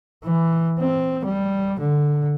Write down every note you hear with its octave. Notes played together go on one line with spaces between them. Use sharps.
E3
C4
G3
D3